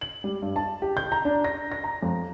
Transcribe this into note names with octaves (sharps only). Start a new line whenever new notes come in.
F#7
G3
G2
A5
G4
G6
A#5
D4
A#6
A#6
A#5
F2